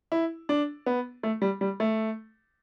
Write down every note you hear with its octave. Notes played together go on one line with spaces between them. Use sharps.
E4
D4
B3
A3
G3
G3
A3